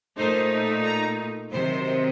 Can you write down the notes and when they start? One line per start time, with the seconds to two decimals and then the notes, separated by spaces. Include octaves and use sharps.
0.17 A#2 A3 D#4 C5
0.84 A#5
1.51 C3 D#3 F#3 C5